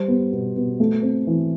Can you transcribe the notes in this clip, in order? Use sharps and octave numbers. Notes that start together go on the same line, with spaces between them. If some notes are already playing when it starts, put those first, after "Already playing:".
Already playing: G3 C5
B3
B2
B2
A3
C4
E3